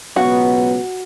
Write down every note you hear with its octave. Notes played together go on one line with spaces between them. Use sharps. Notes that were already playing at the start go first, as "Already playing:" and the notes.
C#2 B2 F#3 B3 F#4